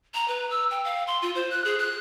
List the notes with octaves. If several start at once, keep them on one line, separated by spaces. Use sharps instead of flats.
A#5
B4
E6
G5
F5
C6
F4
C5
F#6
G#4
F#6